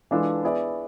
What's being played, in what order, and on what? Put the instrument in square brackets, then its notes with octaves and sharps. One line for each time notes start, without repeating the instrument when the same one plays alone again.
[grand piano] E3 G#3 D4 F4 A4
B3 E4 G#4 D5